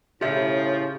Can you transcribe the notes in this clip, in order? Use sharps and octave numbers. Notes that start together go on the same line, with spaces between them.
A2 C#3 F3 G4 E5